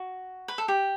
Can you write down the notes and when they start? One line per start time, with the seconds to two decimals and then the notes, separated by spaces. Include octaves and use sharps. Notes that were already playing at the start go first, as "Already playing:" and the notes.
Already playing: F#4
0.48 B4
0.58 A4
0.68 G4